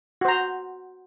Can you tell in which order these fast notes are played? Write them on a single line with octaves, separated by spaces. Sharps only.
F#4 C5 A#5